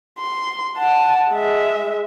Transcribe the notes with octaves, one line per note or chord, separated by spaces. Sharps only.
C6
F#5 A5
G#3 E5